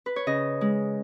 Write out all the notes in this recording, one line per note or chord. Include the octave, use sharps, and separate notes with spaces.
B4
C#5
C#3 D#5
G#3